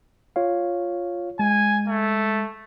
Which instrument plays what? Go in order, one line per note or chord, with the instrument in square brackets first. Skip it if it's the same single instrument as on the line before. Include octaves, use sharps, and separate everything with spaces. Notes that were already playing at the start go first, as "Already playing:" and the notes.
[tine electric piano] F4 C#5 F5
[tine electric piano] G#3 [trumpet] G#5
[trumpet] A3